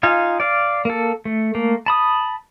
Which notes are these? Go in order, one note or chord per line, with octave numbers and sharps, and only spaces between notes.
D#4 F4 F5 G#5
D5 F5
A#3 A4
A3
A3 A#3
A5 B5 D#6